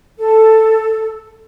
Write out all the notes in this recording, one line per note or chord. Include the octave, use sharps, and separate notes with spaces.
A4